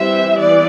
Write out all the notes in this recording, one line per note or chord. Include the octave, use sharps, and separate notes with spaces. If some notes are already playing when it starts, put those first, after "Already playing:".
Already playing: E3 G3 C4 E5
E3 B3 D5